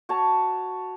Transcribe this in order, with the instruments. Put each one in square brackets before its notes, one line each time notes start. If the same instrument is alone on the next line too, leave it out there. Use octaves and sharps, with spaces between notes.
[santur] F#4 C#5 A5